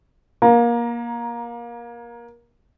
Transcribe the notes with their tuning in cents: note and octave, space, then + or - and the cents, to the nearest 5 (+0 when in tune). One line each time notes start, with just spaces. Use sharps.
A#3 +25 A#5 +10